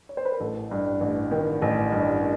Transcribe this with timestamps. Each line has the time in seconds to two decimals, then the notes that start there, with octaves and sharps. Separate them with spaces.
0.09 C#5
0.17 C5
0.25 B4
0.32 A#4
0.40 A1 A4
0.71 G2
1.01 A1
1.31 D#3
1.62 A1
1.92 G2